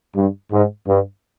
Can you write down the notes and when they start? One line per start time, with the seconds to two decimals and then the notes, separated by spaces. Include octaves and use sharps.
0.16 G2
0.52 G#2
0.88 G2